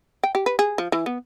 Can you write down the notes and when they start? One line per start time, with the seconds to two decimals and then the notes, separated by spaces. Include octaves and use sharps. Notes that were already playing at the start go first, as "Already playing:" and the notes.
0.23 G5
0.35 G4
0.46 B4
0.59 G#4
0.78 F3
0.92 E3
1.06 B3